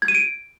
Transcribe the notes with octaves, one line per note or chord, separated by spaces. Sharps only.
G#6
D#7
D7